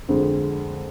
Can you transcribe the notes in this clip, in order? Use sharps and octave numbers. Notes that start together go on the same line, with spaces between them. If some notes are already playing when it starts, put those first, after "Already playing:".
F2 D3 G#3